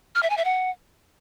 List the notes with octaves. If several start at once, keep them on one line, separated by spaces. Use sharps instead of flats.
F6
E5
G#5
E5
F#5